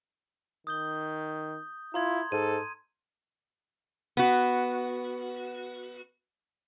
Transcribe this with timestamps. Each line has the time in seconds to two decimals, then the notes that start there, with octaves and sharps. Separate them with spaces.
0.67 D#3 D#6 G6 G7
1.94 E4 F4 A#5 C6 G#6
2.32 G#2 A4 D#7
4.17 B3 F#4